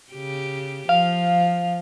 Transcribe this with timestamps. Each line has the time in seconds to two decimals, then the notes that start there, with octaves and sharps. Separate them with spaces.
0.12 C#3 G4
0.89 F3 F5